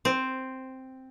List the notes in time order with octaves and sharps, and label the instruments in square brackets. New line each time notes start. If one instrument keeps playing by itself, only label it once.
[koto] C4